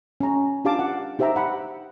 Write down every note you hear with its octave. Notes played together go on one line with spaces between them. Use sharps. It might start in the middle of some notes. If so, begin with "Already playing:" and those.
C#4 A#5
D4 F4 G4 F5 A5 D6
F#5
D#4 G4 C5 E5 G5 A#5
F#5 B5